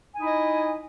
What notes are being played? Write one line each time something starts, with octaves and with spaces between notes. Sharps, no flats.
D#4 E4 D#5 G#5